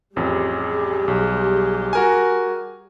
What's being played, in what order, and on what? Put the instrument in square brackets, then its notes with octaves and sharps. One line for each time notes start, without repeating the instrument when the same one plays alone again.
[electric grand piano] A1 F2 [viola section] G3 G4 G#4
[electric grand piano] B1
F#4 A#4 G#5